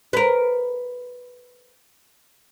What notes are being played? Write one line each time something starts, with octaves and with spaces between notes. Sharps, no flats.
A#4 B4